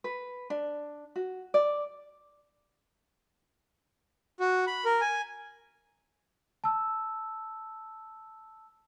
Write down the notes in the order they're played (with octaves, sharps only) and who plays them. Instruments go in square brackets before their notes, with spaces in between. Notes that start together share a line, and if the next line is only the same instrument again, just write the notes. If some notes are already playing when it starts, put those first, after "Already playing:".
[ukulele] B4
D4
F#4
D5
[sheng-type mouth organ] F#4
B5
A#4
G#5
[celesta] A5 E6